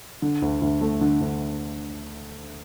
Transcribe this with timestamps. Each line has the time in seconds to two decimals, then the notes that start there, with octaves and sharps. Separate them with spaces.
0.22 D3
0.42 D2
0.62 D2
0.81 A3
1.01 D3
1.21 D2